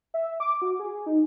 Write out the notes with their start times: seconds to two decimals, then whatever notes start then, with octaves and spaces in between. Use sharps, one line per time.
0.14 E5
0.40 D6
0.62 F#4
0.79 G#4
1.06 D#4